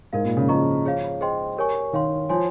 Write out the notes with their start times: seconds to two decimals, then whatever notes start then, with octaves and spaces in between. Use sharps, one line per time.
0.13 G#2 D#4 A#4 F5
0.25 A#2
0.37 C#3
0.49 F3 G#4 D#5 A#5 C#6
0.85 G#4 C#5 F5
1.21 G#4 C5 D#5 G5 C6
1.57 G4 A#4 C#5 G#5 C#6
1.93 D#3 C#5 F5 C6
2.29 F3 C#5 G#5 C6